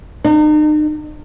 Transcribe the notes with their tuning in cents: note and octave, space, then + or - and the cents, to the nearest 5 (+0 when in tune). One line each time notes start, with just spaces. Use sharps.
D#4 -40